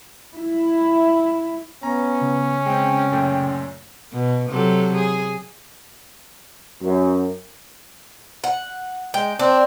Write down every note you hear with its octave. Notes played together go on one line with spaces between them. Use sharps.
E4
B3 C#4 A#5
C#3
G#3 C4 G5
F#2 A#2 A3
B2
C3 F#3 A4
G#4
F#2
F#5
G#3 G5
C4 D4